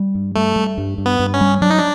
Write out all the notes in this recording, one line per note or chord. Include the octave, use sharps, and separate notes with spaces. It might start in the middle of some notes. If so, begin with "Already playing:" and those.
Already playing: G3
G2
G3 A3
G3
G2
G2
B3
G2
C#4
G3
F#3 D4
D#4
D4